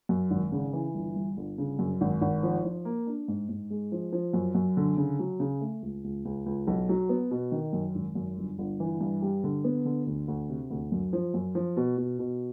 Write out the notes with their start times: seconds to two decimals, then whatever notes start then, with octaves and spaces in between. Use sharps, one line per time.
0.09 F#2
0.31 G#1
0.52 C#3
0.73 E3
0.95 G1
1.16 G2
1.37 G1
1.58 C#3
1.79 F#2
2.01 G#1
2.21 G#1
2.43 F3
2.64 F3
2.85 A#3
3.07 D4
3.28 G#2
3.49 G#2
3.70 G#3
3.92 F3
4.13 F3
4.34 F#2
4.55 F#2
4.77 D3
4.97 C#3
5.19 F#3
5.40 C#3
5.61 A3
5.82 C#2
6.04 C#2
6.25 C#2
6.46 C#2
6.67 B1
6.89 F#3
7.09 B3
7.31 B2
7.52 D#3
7.73 F#2
7.95 G#1
8.15 F#2
8.37 G1
8.58 G1
8.80 E3
9.01 G2
9.22 G3
9.44 D3
9.64 B3
9.85 D3
10.07 D2
10.28 D2
10.50 C3
10.70 D2
10.92 F#2
11.13 F3
11.34 F#2
11.55 F3
11.77 B2
11.98 B2
12.19 B2